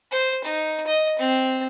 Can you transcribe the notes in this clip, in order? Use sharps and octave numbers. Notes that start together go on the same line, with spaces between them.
C5
D#4
D#5
C4